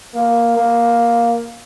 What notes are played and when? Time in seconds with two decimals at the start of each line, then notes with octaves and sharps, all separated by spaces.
0.14 A#3
0.57 A#3